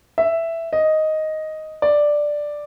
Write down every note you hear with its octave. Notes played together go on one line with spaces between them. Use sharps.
E5
D#5
D5